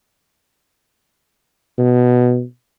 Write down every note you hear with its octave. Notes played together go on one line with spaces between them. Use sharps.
B2